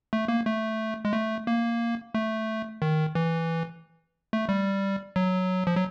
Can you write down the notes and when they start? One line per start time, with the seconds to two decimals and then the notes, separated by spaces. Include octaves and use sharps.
0.13 A3
0.28 A#3
0.46 A3
1.05 G#3
1.13 A3
1.47 A#3
2.15 A3
2.82 D#3
3.15 E3
4.33 A3
4.49 G3
5.16 F#3
5.67 F3
5.76 F#3